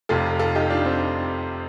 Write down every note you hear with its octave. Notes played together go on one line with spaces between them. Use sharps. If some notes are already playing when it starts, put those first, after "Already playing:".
F1 F2 C3 F4 A4
F4 A4
D#4 G4
D4 F4
C4